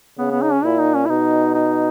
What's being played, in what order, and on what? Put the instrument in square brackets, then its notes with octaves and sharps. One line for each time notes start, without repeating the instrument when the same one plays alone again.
[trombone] C#3 [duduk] B3
[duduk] B3
D#4
C#4
[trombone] A#2 [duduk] E4
[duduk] D#4
C#4
E4
[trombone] B2 [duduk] D#4
[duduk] D#4